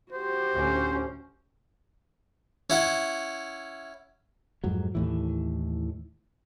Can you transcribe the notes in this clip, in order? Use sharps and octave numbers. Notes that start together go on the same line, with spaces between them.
F#4 G4 C5
D2 A2 C#4
C#4 E4 F#5
F2 G#2 F#3
D#2 A2 E3